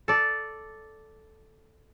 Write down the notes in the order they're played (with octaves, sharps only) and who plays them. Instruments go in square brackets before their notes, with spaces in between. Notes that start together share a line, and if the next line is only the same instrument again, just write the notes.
[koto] A4 D5